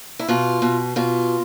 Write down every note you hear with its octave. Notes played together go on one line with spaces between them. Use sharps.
E4
B2 F4
B2
B2 F4